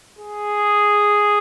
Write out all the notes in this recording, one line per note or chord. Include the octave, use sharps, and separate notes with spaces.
G#4